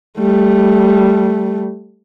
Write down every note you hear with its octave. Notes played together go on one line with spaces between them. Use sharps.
G3 A3